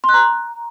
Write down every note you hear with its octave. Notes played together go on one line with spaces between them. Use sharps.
C6
F#6
A#5